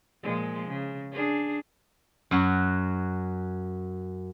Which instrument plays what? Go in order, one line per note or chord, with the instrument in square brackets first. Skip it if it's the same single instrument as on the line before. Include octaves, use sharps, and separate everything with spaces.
[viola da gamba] A#2 F3 G#3
C#3
D4 G#4
[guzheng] F#2 F#3 F#4